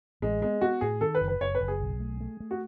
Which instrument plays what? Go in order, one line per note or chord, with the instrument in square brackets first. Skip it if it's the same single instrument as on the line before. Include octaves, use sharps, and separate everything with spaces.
[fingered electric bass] A1 [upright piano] G#3
[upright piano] G#3 [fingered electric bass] B3
[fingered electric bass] B3 [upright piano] F#4
[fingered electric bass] A2 [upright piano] G#4
[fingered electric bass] D#3 [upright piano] A4
[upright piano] B4
[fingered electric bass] F#1
[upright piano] B4
[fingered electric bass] F#1 [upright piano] C#5
[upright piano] B4
[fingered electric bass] F#1
[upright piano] G#4
[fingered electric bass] B1
A3
A3
A3
[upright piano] F#4